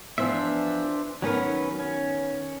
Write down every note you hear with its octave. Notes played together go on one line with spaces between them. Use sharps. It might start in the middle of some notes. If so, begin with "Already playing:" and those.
E3 F3 B3 D4 C5 E5
D#3 F#3 B3 C#4 A#4 B4
C#4